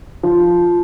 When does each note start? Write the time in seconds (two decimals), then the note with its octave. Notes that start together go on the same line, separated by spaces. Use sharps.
0.23 F3